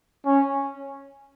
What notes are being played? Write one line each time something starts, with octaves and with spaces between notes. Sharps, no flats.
C#4